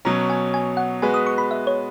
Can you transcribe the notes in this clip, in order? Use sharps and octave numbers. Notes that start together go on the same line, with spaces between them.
B2 F#3 C#4 A#5
G#5
G#5
F#5
G#3 B3 F#4 B4 G#5
D#6
C#6
B5
E5
C#5